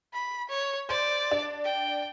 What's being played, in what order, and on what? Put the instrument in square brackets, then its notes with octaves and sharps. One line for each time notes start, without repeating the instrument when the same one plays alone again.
[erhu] B5
C#5
[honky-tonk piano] C5 [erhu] D5
[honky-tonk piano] D4
[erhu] G5